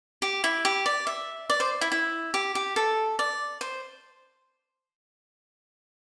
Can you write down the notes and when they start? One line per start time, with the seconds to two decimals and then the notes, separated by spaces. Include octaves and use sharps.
0.22 G4
0.44 E4
0.65 G4
0.86 D5
1.07 E5
1.50 D5
1.60 C5
1.81 E4
1.92 E4
2.34 G4
2.55 G4
2.76 A4
3.19 D5
3.61 C5